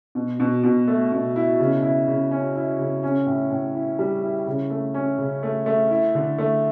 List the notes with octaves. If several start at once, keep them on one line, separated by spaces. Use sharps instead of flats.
B2
B2
B2
A3
B2
E4
C#3
E4
C#3
C#4
E4
C#3
C#4
A2
A2
E4
G3
E4
C#3
A3
C#4
C#3
A3
A3
E4
D3
A3